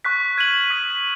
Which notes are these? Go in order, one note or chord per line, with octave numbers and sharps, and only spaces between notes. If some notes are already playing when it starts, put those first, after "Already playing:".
C#6 F#6 B6
F6 G#6 D#7 F#7
D#6 G#6 B6